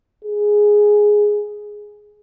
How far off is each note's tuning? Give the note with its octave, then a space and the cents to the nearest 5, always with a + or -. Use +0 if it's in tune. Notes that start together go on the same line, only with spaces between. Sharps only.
G#4 +0